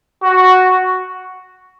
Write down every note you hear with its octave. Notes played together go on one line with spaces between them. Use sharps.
F#4